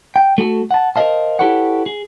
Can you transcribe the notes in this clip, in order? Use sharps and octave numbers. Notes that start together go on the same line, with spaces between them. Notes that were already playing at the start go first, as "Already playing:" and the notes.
G5
A3 F#4 G4 A4
F#5 A5
A#4 C5 D5 D#5 F5 A5
E4 G4 A4 B4 C#5 F#5
G#4